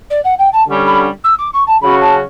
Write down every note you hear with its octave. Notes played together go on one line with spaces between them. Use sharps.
D5
F#5
G5
A5
D3 G3 C#4
B5
E6
D6
C#6
A5
C#3 F#3 C#4 F#4 B5
A5